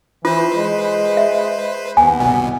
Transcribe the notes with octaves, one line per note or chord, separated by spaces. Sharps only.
E3 F4 B4 C5
G#3
E5
D#2 B3 G#5
G1 C2 B2